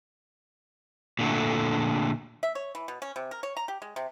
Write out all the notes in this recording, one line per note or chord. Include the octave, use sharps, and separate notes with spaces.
A#2 D3 A3
E5
C#5
E3
B2
C#4
C3
A#4
C#5
A#5
G4
G#3
C3